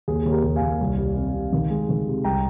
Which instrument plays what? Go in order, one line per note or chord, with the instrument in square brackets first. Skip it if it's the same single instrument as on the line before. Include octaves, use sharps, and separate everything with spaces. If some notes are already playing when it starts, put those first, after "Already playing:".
[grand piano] D#2 G#4
D#2
G4 A#4
D#2
F5 G#5
D#2
C2
G3
C3
C3
D#3
G#3
D#3
C3
C2 G5 A#5